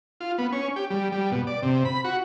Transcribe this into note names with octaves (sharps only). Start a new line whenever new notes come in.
F4
B3
C#4
G4
G3
G3
B2
D5
C3
B5
F#4